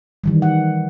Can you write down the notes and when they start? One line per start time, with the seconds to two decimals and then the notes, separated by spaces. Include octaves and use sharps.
0.24 D#3 E3 G3
0.42 F#5